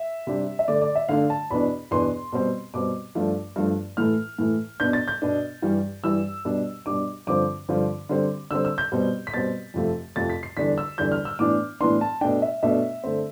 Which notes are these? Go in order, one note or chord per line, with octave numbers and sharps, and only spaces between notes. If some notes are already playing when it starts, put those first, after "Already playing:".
Already playing: E5
C3 G3 D4
E5
D3 A3 D4 D5
D5
E5
D3 A3 D4 F5
A5
E2 B2 B3 D4 B5
E2 B2 B3 D4 C6
B2 G3 C4
B2 G3 C4 D6
G2 F3 A3 D4
G2 F3 A3 D4
A2 E3 A3 F6
A2 E3 A3
B2 B3 D4 G6
A6
G6
B2 B3 D4
G2 E3 G3
G2 E3 G3 E6
B2 G3 D4
B2 G3 D4 D6
G2 D3 F3 C4 D6
G2 D3 F3 C4
D3 G3 C4
D3 G3 C4 E6
E6
G6
B2 G3 C4
B6
B2 G3 C4 A6
F2 C3 F3 A3
F2 C3 F3 A3 A6
B6
C7
E2 D3 G3 D4 B6
E6
E2 D3 G3 D4 G6
F6
E6
A2 E3 B3 D4 D6
A2 E3 B3 D4 C6
A5
B2 A3 D4 G5
E5
B2 A3 D4 E5
D3 A3 C4